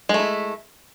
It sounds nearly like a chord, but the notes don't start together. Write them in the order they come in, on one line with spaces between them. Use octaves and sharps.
G#3 A3 E4